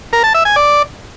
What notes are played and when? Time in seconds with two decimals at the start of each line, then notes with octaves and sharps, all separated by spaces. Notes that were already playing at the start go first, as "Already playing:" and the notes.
0.13 A#4
0.24 A5
0.34 E5
0.45 G#5
0.56 D5